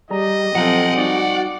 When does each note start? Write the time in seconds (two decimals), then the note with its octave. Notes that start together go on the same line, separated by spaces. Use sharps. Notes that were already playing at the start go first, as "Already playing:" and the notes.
0.10 G3 G#4 D5 D#5 A#5
0.55 F3 F#3 C4 A4 F5 F#5 A#5
0.97 G3 D#4 F#4 D5